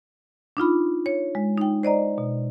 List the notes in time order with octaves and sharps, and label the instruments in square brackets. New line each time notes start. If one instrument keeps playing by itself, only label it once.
[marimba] D4 D#4 F4 B5
C#5
G#3
D#4 G5
C5 D5 D#5 A#5
B2